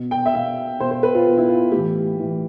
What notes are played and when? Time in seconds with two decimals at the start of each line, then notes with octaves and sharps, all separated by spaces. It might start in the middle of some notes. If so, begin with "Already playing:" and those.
Already playing: B2
0.11 G5
0.26 E5
0.34 B2 F5
0.80 B2 C5
0.91 C5
1.03 B4
1.15 F4
1.26 B2 F4
1.38 E4
1.49 F4
1.71 A2 G4
1.76 E3
2.17 A2 E3